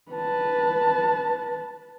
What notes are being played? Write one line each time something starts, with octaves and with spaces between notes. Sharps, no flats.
B4 A5